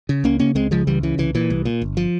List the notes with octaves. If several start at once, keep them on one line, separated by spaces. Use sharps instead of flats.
C#3
C#2 A#3 C#4
C#3 A#3 C#4
C#2 G#3 C4
C#3 F3 G#3
C#2 E3 G3
C#3 E3
C2 E3
A#2 E3
C2
A#2
G1
F3